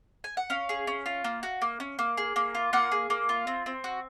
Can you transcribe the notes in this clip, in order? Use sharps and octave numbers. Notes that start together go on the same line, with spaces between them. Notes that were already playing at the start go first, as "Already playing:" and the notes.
G#5
F#5
C#4 F5
G#4
C#4
F4
A#3
F#4
A#3
C#4
A#3
G#4
A#3
F4
A#3 F#5
G#4
A#3
F4
C4
C4
F#4